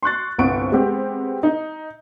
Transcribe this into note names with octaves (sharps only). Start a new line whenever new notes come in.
C6 C#6 F#6 A6
G1 C2 B3 C4 C#6 D7
G#3 B3 C4 G4
D#4